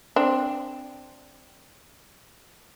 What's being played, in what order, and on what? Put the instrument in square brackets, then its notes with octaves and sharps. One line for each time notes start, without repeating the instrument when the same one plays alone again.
[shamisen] C4 D4